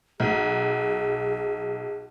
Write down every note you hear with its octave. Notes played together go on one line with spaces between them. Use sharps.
B1 G#4